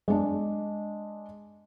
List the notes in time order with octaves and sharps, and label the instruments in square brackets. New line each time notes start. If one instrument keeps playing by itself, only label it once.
[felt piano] G#3 D4